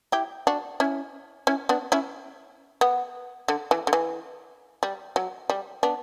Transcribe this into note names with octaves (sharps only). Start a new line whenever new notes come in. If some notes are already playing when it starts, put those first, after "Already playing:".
E4 G4
D4 F#4
C#4 E4
C#4 E4
B3 D4
C#4 E4
B3
D3
E3
D3
E3
G3
F#3
G3
B3 D4